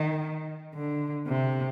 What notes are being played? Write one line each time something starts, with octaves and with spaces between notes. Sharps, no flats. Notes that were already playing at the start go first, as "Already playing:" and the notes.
Already playing: D#3
D3
C3